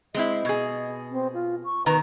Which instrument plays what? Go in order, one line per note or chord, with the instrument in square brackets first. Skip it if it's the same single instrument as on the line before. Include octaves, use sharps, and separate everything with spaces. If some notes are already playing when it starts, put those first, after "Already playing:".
[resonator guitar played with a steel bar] G#3 C4 E4 [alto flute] D#5
[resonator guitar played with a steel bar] B2 G#4
[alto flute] C4
F4
C#6
[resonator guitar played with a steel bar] B2 D#3 A#5 [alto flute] B4